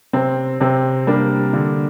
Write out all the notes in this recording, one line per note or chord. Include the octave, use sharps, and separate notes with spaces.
C3 C4
C3 C4
G3 A#3 D4
D3